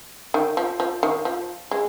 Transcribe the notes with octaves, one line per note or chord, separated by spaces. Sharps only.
D#3
F3
F3
D#3
F3
G#3